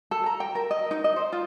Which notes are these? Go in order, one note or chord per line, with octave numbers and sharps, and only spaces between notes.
A4
A#5
G5
A#4
D#5
D#4
D#5
C5
F4